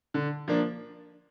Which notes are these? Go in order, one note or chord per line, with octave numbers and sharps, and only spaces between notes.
D3
F3 A#3 D4